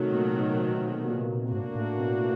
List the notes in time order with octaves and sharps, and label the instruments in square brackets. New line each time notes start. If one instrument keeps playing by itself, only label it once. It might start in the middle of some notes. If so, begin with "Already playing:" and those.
Already playing: [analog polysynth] C3 [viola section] D#3 F#3 A3
[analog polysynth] A#2
B2
C3
B2
A#2
[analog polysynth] G#2 [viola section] A#3 D4 F#4
[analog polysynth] A2
B2